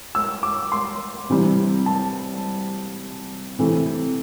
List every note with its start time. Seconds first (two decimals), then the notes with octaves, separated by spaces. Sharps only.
0.15 E6
0.43 D6
0.72 C6
1.30 C3 E3 G3
1.86 A5
3.59 C3 E3 A3